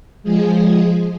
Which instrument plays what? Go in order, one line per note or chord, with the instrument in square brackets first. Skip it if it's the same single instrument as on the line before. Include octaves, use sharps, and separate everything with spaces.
[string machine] F3 G#3 G#4